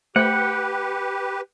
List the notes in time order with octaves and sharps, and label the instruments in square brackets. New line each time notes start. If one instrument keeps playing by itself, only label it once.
[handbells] A3 C5 F#6 [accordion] G4 B4 [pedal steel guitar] F#5 G5